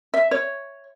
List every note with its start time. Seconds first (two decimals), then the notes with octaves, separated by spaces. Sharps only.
0.14 E5
0.31 C#5